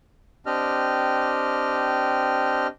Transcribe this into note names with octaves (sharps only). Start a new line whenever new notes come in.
C4 D4 G4 D#5 F6